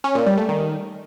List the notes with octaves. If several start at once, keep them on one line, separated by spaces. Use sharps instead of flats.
C#4
A#2
G3
A3
D#3